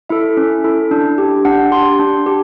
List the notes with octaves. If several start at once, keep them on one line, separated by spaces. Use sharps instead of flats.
E4 A4 E5
C#4
E4 A4
D4
G4
D4 F#5
G4 C6
D4
G4